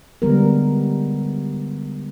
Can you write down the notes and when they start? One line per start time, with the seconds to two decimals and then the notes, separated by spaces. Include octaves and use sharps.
0.22 D3 G3 G#3 B3 A#4